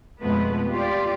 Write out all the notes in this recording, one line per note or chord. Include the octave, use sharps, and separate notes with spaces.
F2 B2 G#3 A3 B3 B4
F4 G4 D5